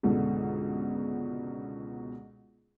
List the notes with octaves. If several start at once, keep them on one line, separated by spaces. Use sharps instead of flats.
C#2 G#2 B2 D3